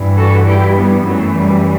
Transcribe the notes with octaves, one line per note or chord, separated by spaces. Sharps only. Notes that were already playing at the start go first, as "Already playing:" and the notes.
Already playing: G2 E3
F#4 A4
E4 G4
G3 B3
F#2 E3 F#3 A3
G3